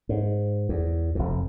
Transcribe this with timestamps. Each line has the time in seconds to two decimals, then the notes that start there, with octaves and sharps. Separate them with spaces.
0.09 G#2
0.69 E2
1.15 F1 F2